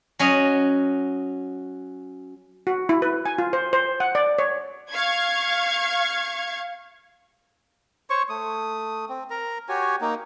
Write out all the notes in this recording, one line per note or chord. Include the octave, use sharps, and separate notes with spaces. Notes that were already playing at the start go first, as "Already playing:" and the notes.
F#3 C#4 D#5
F#4
E4
B4
G#5
F4
C5
C5
F#5
D5
C#5
F5 C#6 G#6
C5 C#5 C#6
A3 D#6
C4
A#4 A#5
F#4 G4 C#5 G#5
A#3 D#4